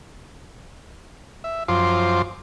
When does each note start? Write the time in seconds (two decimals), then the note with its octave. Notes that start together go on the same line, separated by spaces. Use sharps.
1.44 E5
1.68 F#2 F3 F4 C5 C6 D6